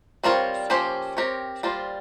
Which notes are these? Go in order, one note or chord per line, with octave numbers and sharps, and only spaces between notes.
G3 C4 F4 A#4 C#5
F3 A#3 C#4 G4 C5
C4 G4 A#4 C#5
G3 A#3 F4 C5